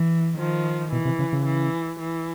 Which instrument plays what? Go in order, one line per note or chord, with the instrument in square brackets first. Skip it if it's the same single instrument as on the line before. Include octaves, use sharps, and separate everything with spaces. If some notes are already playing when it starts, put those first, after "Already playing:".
Already playing: [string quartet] E3
D#3 F3
[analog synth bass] B2 [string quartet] E3
[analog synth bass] C3
C#3
C#3
[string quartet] E3
E3